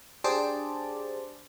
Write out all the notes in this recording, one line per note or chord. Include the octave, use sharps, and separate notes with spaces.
D4 G4 G#4 C5 A5 D6